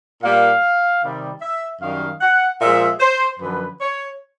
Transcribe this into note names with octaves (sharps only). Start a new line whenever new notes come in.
A#2 G3 A#3 F5
C3 D#3 G3
E5
F#2 D#3 G3 F5
F#5
A#2 F3 G#3 E5
C5
F#2 D3 F3 B4
C#5